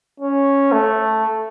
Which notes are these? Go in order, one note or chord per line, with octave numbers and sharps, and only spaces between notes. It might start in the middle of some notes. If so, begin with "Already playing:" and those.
C#4
A3